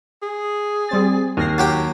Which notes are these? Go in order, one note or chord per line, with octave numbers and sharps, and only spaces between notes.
G#4
G3 C4 A6
D#2 F6 A#6 C7
F#3 G4 G5